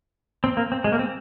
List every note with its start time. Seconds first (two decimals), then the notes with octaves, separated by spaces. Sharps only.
0.44 C4
0.57 A#3
0.72 C4
0.84 G#3
0.92 A#3
0.99 C4